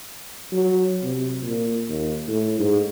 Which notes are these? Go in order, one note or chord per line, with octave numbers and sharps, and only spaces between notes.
F#3
C3
A#2
D#2
A2
G#2